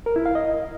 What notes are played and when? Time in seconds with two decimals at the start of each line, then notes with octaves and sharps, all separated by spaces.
0.06 A#4
0.16 E4
0.26 F5
0.35 D#5